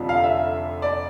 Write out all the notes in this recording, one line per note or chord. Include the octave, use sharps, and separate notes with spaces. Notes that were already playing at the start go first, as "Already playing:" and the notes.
Already playing: F1 F2 D3 F3
F5
E5
D5